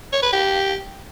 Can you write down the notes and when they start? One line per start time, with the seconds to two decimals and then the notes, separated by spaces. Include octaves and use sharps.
0.12 C#5
0.23 B4
0.33 G4